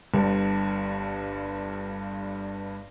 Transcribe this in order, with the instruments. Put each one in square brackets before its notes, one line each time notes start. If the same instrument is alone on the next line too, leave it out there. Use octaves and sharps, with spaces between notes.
[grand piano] G1 G2